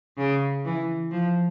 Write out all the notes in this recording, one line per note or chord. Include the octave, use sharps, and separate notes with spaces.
C#3
E3
F3